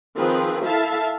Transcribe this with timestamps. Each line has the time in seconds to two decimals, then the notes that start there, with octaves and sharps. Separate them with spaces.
0.17 D#3 F3 C4 F4 G#4 B4
0.65 E4 A4 E5 F5 A5